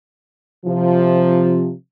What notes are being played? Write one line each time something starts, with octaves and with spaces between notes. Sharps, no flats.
C3 F3